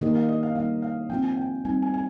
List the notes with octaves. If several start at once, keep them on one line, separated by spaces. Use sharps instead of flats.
D#3 A#3 D#4 G4 A#4 D#5
F5
D#5
F5
G3 A#3 D#4 F5
F5
F3 C4 F4 G5
G#5
G5
G3 C4 D#4 G#5
G#5
G#5